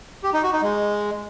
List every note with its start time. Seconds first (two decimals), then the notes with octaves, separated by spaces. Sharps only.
0.24 G4
0.33 D#4
0.43 F#4
0.53 D#4
0.62 G#3